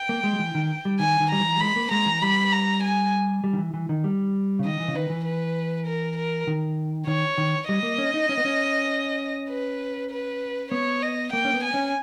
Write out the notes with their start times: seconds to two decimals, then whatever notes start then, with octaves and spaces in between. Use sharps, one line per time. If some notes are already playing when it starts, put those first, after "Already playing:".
Already playing: G5
0.09 A#3
0.24 G#3
0.33 G3
0.39 E3
0.55 D#3
0.85 G3
0.99 D#3 G#5
1.20 D#3
1.31 G3 A#5
1.41 E3
1.57 G3
1.60 G#3 B5
1.76 A#3
1.91 G#3 A#5
2.06 E3
2.22 G3 B5
2.52 A#5
2.83 G#5
3.44 G3
3.53 D#3
3.58 E3
3.74 E3
3.89 D#3
4.04 G3
4.59 C#3
4.65 D#3 D#5
4.80 E3
4.88 C#3
4.95 D#3 B4
5.10 E3
5.25 B4
5.87 A#4
6.17 A#4
6.47 D#3
7.07 D#3 C#5
7.38 D#3
7.68 G3 D#5
7.83 A#3
7.98 C#4
8.14 D#4
8.29 C#4
8.37 B3
8.45 C#4
9.50 B4
10.11 B4
10.72 B3 C#5
11.02 D#5
11.33 A#3 G5
11.45 C#4
11.54 B3
11.64 G#5
11.74 C#4